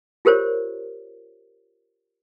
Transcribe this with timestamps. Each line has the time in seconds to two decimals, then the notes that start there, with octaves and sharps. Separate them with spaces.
0.25 F4 G4 A#4 C5 C#5